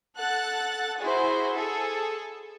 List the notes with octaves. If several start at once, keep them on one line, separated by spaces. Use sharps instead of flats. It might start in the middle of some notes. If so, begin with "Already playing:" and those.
A4 F#5 F#6 A6
E4 F#4 G#4 C5
G#4 A4